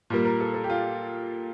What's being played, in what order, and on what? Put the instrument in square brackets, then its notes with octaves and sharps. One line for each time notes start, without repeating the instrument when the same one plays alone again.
[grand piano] A#2 G3 A#3
[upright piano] A#4
A4
A4
G4
F4